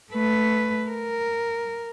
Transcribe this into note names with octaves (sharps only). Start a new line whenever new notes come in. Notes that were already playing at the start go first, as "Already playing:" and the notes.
A3 B4
A#4